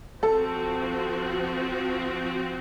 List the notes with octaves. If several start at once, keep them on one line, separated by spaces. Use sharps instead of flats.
F3 C4 F#4 A4